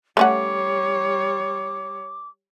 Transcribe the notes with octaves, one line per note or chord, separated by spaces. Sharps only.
G3 A3 C#4 C#5 F#5 D6